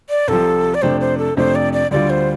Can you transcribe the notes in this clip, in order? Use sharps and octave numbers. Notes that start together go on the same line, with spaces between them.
D5
C2 C3 F3 A4
D5
F2 C3 A3 D4 C5
C5
A4
F2 C3 A3 D4 C5
D5
D5
D2 D3 G3 F4 D5
C5